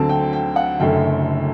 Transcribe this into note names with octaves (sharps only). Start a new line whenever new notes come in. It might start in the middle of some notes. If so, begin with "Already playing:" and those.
Already playing: D2 D3 F#3 C4 A5
G5
G5
F#5
F#1 F#2 D3 A3 G5